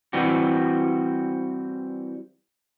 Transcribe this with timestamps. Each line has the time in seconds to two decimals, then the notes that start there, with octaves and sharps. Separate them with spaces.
0.13 E3 G3 C4 F#4